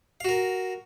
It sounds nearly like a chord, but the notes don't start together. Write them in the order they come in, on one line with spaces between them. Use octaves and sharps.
F5 F#4 A#4